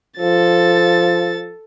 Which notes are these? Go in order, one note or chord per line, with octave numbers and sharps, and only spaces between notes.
F3 A4 A6